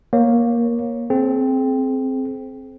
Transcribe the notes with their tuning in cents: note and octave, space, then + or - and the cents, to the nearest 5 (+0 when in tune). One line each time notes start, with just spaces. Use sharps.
A#3 +15 C#5 -5
C4 +0 G#4 +40